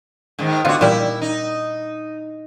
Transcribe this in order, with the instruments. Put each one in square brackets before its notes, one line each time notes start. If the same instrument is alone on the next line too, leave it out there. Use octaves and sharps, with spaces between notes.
[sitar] G#2 D#3
[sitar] D3 F#4 [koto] B3 F4
[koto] A#2 G3 [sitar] E4
[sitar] D#4